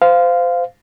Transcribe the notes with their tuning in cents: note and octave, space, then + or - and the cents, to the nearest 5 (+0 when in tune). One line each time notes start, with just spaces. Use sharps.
C5 -25 F5 +0